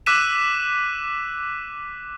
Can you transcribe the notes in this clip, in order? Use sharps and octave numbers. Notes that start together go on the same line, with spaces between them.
D6 E6 F#6 B6 D#7 E7